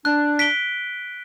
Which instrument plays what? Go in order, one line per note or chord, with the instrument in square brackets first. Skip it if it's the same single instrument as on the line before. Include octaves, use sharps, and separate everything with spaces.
[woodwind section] D4 [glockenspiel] F#6
[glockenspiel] B6 D7 G7